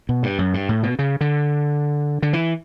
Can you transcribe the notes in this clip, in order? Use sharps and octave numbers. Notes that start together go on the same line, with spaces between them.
B2
G2
F#2
G2
A2
B2
C#3
D3
D3
E3